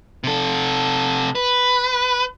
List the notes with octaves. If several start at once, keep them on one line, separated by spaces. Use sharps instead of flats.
C3 A4
B4